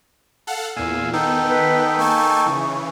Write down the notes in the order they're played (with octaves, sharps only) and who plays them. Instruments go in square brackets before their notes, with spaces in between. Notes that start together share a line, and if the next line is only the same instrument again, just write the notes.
[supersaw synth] A4 F5 F#5
[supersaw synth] E2 A#2 [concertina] F5 G#5 E6
[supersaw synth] D#3 B3 [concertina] D#4 A4 G5
[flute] B4
[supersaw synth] A#3 G#5 A5 [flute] C#6
[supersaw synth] C#3 E3